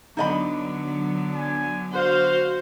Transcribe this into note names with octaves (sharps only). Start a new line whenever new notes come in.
D3 F#3 B3 D#4 D#5 B5
G#5
F#4 C5 F5